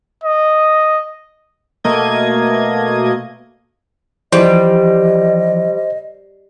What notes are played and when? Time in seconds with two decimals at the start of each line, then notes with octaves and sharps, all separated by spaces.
0.24 D#5
1.84 B2 A3 A#3 D#5 G#6
4.32 E3 F3 G3 C5 D#5